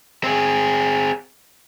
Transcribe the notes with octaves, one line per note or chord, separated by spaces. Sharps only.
C4 G#4